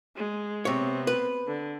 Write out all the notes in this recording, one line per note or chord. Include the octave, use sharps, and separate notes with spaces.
G#3
C3 B3 C4 C#5
B4
D3